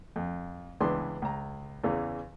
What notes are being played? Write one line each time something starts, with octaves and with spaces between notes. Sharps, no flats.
F2
C#2 E3 B3 D4 G#4 C6
C#2 A#5
E2 C#3 E3